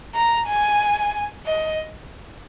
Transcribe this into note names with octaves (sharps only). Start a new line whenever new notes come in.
A#5
G#5
D#5